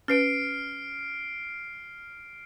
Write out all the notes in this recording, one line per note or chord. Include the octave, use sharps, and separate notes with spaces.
C#4 B4 F6 C7 D7